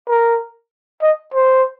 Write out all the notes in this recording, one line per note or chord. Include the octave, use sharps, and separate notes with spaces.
A#4
D#5
C5